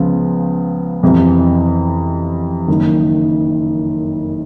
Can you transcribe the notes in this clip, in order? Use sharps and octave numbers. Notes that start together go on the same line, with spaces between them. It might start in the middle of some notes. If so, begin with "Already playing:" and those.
Already playing: C#2 C#3 F3 B3
F2 C3 E3
F#1 F#2 D#3